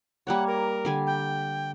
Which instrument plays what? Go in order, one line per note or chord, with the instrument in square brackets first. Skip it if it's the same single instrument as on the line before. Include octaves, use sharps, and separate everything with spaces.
[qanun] G3 A#3 C#5 [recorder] F#5
[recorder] A#4
[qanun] D3 G3 G#5
[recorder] G5